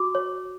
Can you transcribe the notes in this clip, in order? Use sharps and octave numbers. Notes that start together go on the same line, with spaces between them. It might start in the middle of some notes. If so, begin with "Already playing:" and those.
Already playing: F#4 D6
C#5